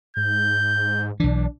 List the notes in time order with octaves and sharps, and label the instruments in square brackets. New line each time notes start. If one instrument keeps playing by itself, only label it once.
[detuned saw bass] G#2 [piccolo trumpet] G6
[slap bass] B1 E3 [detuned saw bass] D4